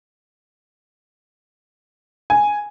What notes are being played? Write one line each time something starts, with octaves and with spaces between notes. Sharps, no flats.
G#5